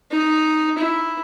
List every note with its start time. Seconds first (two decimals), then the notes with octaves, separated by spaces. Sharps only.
0.11 D#4
0.78 E4